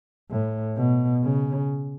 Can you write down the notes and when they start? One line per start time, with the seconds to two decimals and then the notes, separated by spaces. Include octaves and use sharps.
0.30 A2
0.77 B2
1.24 C#3